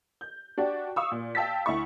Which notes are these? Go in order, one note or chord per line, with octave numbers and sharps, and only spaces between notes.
G6
D4 F#4 G4 D5
F5 C#6 D#6 E6
A#2
F5 G5 A5 E6 A6 B6
D2 E4 C#6